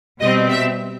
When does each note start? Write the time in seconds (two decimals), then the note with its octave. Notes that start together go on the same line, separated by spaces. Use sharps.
0.20 B2 G3 C4 D#5
0.50 E5